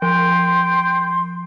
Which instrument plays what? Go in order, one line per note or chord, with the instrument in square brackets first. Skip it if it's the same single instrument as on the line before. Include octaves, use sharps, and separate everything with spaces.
[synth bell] F3 [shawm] G5 [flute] C6